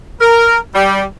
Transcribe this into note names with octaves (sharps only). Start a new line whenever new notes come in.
A#4
G3